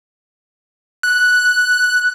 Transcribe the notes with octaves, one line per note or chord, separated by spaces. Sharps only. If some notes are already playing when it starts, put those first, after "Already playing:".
F#6